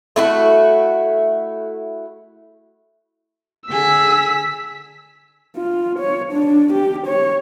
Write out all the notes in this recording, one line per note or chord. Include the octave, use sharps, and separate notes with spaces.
A3 E4 F#4
D3 G#4 E6 B6
F4
C#5
D4
G4
C#5